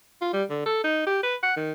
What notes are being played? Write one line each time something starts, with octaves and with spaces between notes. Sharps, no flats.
F4
G3
D3
A4
D#4
G4
B4
F#5
D#3